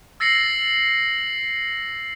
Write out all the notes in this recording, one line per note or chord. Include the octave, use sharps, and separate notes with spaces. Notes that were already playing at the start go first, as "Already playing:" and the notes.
E6 A6 A#6 C7 C#7 F#7